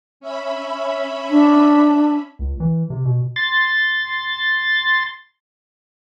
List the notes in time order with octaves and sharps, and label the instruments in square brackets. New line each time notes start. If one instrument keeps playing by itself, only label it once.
[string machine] C#4 E5 B5
[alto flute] D4
[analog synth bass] C#2
E3
C3
B2
[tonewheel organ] C6 A6